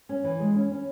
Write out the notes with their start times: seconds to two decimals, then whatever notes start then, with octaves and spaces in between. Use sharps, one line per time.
0.09 C#4
0.24 E3
0.40 G#3
0.55 C#4
0.72 C#4